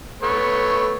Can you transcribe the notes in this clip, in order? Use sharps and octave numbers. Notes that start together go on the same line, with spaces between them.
A3 B3 C#5